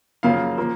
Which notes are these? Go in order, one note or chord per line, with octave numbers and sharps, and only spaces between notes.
F#2 C#3 F3 A#3 F5
F3 A#3